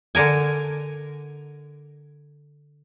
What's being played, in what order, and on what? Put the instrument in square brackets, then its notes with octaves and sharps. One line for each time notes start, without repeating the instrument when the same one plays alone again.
[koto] D3 D4 A#4 G#5